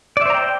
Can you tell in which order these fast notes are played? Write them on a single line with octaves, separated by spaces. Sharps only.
D5 E5 C5 A#5 G5